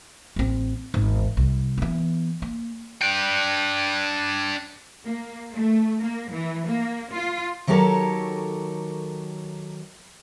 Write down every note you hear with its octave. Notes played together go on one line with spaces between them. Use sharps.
A1 C4
G#1 E2
C2
E3 B3
A#3
D4 G5
A#3
A3
A#3
E3
A#3
F4
D#3 F#3 G4 A4 A#4 C#5